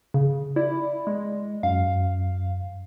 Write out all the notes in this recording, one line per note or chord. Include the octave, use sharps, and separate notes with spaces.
C#3
E4 D5
G#3
F#2 F5